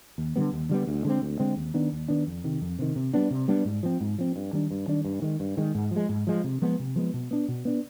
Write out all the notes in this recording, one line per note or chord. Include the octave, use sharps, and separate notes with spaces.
D#2
D3 G3 B3
D#2
D3 G3 B3
D2
D3 G#3 C4
D2
D3 G#3 C4
D#2
D#3 B3 D4
D#2
D#3 B3 D4
F2
C3 D#3
F2
C3 D#3
C3
G3 B3 D4
C3
G3 B3 D4
G#2
F3 C4
G#2
F3 C4
G2
D#3 G3 D4
G2
D#3 G3 D4
G2
D#3 G#3
G2
D#3 G#3
G#2
F3
G#3
G#2
F3 G#3
C3
F3 G#3 B3
C3
F3 G#3 B3
B2
B3 D4
B2
B3 D4